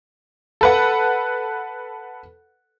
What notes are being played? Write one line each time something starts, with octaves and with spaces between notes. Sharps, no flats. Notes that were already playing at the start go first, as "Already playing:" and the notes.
A4 B4 F#5